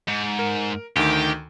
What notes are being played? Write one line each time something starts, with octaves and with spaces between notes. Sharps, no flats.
G#2
A#4
D2 D#3 G4